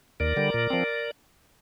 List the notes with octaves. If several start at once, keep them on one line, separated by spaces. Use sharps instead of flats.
D#2 A#4 D5
D3 G3
A#2
F3 C4